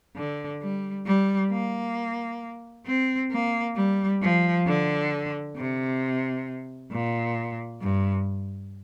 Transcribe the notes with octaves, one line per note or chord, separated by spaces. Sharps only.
D3
G3
G3
A#3
C4
A#3
G3
F3
D3
C3
A#2
G2